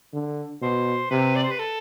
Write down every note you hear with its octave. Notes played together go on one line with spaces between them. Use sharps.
D3
B2 C5
C3 B4
D5
C5
B4
A4